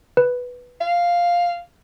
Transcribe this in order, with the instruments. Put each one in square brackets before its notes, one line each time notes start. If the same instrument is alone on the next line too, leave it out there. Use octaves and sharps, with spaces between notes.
[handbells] B4
[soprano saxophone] F5